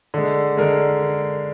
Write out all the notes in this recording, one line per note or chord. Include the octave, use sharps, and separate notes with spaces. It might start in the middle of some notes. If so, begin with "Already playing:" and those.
D3 G#3
D3 G#3 A#4